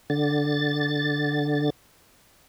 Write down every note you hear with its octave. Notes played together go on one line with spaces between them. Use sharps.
D3 A6